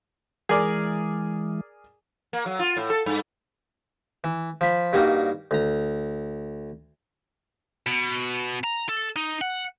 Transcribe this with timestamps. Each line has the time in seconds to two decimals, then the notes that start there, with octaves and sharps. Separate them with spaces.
0.49 E3 G#3 G#4 A#4 D5
2.33 A#3
2.46 F#3
2.59 F4
2.77 A2
2.90 A4
3.06 G2
4.24 E3
4.61 F3 B5
4.93 G2 G3 A#3 D#4 F#4
5.51 D2 A#5
7.86 B2
8.64 A#5
8.89 A4
9.16 D#4
9.41 F#5